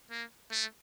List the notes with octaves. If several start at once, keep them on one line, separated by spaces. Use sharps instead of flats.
A#3
A3